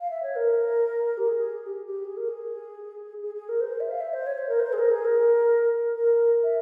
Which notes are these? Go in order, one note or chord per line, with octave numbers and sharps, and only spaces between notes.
F5
E5
C#5
A#4
G4
G#4
G4
G4
G#4
A#4
G#4
G#4
G#4
A#4
C5
E5
F5
E5
C5
C#5
C5
A#4
C5
G#4
A#4
G#4
A#4
A#4
E5